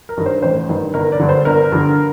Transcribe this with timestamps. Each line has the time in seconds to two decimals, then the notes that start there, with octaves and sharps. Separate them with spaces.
0.09 A#4
0.17 G2 D#3
0.26 C5
0.42 A1 C5
0.69 G2 D#3
0.94 G1 A#4
1.12 D5
1.20 G2 D3
1.29 C5
1.45 G1 A#4
1.72 G2 D3